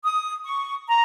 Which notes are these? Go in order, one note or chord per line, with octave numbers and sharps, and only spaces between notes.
D#6
C#6
A#5